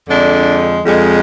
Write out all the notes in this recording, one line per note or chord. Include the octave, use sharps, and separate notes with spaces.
F2 D3 G#3 D4
F2 D3 G#3